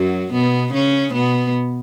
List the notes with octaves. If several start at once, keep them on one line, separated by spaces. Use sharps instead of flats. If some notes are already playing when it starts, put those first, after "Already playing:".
Already playing: F#2 F#3
B2 B3
C#3 C#4
B2 B3